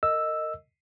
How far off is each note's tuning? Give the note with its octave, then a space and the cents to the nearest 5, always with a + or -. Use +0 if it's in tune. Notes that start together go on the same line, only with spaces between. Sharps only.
A#4 -30 D#5 +0 E6 +0